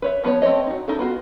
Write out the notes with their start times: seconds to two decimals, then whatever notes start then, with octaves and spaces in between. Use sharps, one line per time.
0.02 B4 C#5 E5
0.23 F3 B3 F4 B4 C#5
0.42 A3 C4 F4 C#5 D#5
0.67 D#4 F#4
0.88 D#4 E4 A4
0.99 B3 F4 F#4